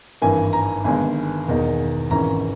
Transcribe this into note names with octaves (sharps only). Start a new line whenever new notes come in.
G#1 G2 E3 A#3 G#5
A#5
G1 G2 D#3 G#3 G#5
E1 E2 D#3 A#3 D#4
G#1 G#2 E3 A#3 C#4 A#5